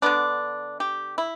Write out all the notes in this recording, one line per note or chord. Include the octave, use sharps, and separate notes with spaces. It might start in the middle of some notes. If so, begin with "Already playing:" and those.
D3 B3 D4
G4
E4